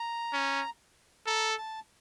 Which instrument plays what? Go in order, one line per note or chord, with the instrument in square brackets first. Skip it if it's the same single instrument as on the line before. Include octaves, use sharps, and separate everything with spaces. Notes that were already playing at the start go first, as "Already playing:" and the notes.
Already playing: [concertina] A#5
[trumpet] C#4
[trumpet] A4 [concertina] A#5
[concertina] A5